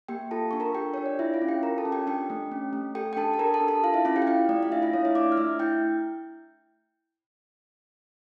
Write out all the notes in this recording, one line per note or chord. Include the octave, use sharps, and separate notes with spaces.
A#3 G4 G5
F4 A4 A5
D4 C#6
A#4 A#5
G4 G5
D4 C#5
D5
E4 F4 E5
F4 F5
C#4
G4 G5
F4 A#4 A#5
A4 A5
C#4
G4 G5
D4 G4 G5
A3
C#4
A3
G4 A4 G5
G5
D4 A4 A5
A5
G4 A#4 A#5
A4 A5
D4
A4 A5
F4 F5
E4 E5
C#4 F4 F5
G4 G5
F5
E4 G4 G5
A3 D5
F5
D4 E4 E5
F4 F5
A3 C#5
E4 E5
D4 D5 D6
F6
A3 E5 E6
E4 G5 G6